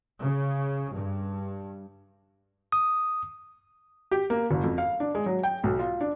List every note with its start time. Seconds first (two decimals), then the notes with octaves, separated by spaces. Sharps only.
0.23 C#3
0.94 G2
2.72 D#6
4.11 G4
4.30 A#3
4.51 F#1
4.64 F2
4.78 F5
5.00 D4
5.15 G#3
5.26 F#3
5.43 G5
5.64 B1
5.79 F4
6.01 D4